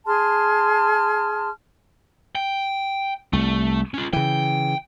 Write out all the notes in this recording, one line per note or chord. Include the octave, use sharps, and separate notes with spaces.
G#4 A5 C6 F6
G5
C2 A3
C#4 F4
C#3 E3 G5